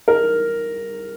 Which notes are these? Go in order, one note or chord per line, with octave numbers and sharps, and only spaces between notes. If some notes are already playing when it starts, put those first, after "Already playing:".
A#4